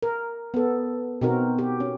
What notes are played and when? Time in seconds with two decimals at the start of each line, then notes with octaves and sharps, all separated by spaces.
0.03 A#4
0.54 B3 A4
1.21 B2 C4 D#4 F#4 A#4
1.59 G4
1.80 C#4